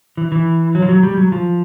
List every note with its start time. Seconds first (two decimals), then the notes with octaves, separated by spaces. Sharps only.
0.17 E3
0.32 E3
0.75 F#3
0.82 F3
0.89 F#3
1.03 G3
1.17 F#3
1.32 F3